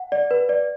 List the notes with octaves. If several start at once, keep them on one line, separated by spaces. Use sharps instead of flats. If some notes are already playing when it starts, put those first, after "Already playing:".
Already playing: F#5
D5
B4
D5